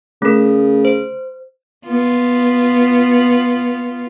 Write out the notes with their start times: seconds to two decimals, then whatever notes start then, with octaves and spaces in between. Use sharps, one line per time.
0.22 C#3 A3 A#4
0.85 C5
1.87 B3 F4